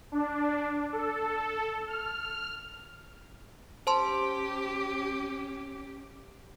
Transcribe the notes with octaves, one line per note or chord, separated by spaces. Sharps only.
D4
A4
F6
C#4 G4 C5 A5 C6